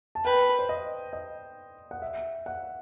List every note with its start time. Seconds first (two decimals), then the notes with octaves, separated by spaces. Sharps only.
0.15 A5
0.24 B4 G5
0.59 C5
0.69 D#5
1.13 D#5
1.91 F#5
2.02 E5
2.46 F#5